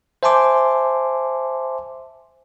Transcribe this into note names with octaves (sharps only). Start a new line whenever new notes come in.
C5 E5 G#5 A5 C6 D6